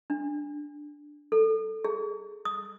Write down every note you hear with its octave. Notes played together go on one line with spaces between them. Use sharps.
D4
A4
G#4
D#6